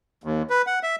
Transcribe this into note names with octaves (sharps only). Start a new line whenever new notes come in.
D#2
B4
F#5
E5